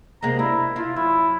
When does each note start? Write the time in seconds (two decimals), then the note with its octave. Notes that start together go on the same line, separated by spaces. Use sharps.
0.22 C3 G#3 A#3 A#5
0.39 D4 E4
0.76 E4 F4
0.96 F#2 E4